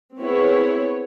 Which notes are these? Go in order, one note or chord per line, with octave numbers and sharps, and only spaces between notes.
B3 C4 E4 G#4 C#5